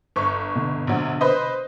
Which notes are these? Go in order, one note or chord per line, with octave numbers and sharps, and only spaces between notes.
G1 C#6
B2 D3
A#1 F#3
B4 C5 D#5